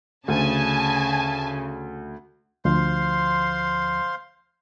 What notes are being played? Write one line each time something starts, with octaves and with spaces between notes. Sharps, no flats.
D2 C#3 G#5 A5
D2 F3 C5 F5 C6